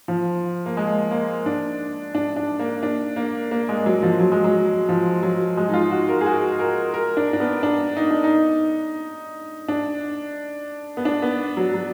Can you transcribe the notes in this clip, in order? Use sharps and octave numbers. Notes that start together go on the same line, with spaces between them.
F3
A#3
G#3
A#3
D4
D4
D4
A#3
D4
A#3
A#3
G#3
F#3
F3
F#3
G#3
F#3
F3
F#3
G#3
D#4
F4
F#4
A#4
G#4
F#4
A#4
A#4
D4
D4
B3
D4
D#4
D4
D#4
D4
B3
D4
B3
F#3
F#3